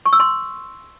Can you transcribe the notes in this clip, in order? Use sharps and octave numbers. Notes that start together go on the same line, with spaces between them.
C#6
E6
C6